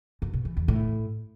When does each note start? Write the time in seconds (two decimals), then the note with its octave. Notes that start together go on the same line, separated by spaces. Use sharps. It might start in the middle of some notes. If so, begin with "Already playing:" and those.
0.22 F#2
0.33 B2
0.45 E3
0.57 E2
0.68 A2